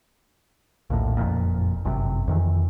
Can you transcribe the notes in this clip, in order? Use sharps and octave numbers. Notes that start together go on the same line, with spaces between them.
A#1 D#2 A2
F#1 F2 A#2
G1 F#2 A2 C3
F2 D#3 E3